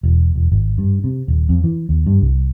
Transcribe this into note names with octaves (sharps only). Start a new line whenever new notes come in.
E1
E1
G#1
G2
C3
D#1
F2
E3
D#2
G2
C2